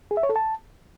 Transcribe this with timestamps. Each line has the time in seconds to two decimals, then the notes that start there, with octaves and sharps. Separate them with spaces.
0.11 G#4
0.17 E5
0.23 C#5
0.29 A4
0.36 A5